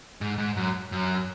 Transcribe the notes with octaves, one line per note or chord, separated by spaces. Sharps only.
G#2
G#2
F#2
F#2